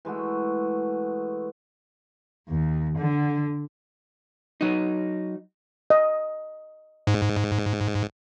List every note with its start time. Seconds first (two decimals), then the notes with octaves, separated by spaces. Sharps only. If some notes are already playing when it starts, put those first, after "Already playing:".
0.05 E3 G#3 A3 F#4
2.49 D#2
2.98 D3
4.61 F#3 D#4
5.90 D#5
7.07 G#2